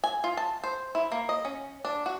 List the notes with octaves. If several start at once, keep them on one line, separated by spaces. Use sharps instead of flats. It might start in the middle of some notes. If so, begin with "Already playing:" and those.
G#5
F4
A5
C5
E4
A#3
D#5
C#4
D4
F#4